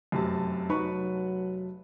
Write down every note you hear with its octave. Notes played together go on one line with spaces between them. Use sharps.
F1 F#2 C3 A5
F#3 D#4 B4 B5 C#6